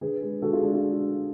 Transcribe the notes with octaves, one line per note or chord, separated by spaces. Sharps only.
D3 G#4 B4
G#3
D3 F#4 A4
F4 G#4
G#3 D4
F4 G#4